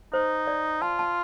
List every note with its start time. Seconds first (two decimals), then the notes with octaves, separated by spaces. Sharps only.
0.13 D#4 C5
0.47 D5
0.82 F4 A5
0.99 A5